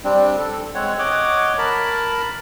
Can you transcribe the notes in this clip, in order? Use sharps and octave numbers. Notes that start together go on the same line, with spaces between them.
G3 C4 D4
A4
G#3 C4 C#5 F#5
C#5 D#5 F#5 D6
A#4 A5 B5